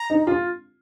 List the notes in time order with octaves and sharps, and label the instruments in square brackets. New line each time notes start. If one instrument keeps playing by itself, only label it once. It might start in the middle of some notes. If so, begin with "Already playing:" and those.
Already playing: [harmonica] A#5
[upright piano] D#4
F4